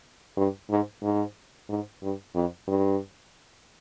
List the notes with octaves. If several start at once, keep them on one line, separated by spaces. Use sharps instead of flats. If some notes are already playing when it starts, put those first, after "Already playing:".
G2
G#2
G#2
G#2
G2
F2
G2